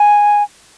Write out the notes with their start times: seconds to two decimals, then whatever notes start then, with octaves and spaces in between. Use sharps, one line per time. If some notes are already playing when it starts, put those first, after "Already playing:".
Already playing: G#5